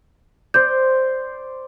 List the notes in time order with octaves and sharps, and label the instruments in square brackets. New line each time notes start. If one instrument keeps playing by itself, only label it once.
[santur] C5 D5 [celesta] G6